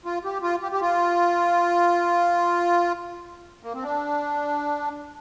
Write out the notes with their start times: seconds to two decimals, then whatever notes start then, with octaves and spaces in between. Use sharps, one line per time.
0.05 F4
0.25 G4
0.42 F4
0.62 G4
0.72 G4
0.81 F4
3.63 A#3
3.74 C4
3.83 D4